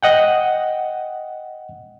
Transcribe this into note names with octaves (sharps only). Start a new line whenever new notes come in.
D#5 F#5 G5